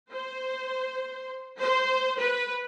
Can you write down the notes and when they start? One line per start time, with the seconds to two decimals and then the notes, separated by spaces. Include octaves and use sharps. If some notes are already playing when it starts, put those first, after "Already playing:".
0.11 C5
1.60 C5
2.18 B4